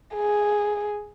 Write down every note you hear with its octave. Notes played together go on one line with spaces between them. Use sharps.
G#4